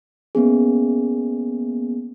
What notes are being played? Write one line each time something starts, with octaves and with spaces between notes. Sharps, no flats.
A#3 B3 C#4 G#4